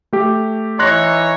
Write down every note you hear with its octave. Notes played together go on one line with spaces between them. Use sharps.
A3 G4
E3 D#4 C#5 C6 F#6 A#6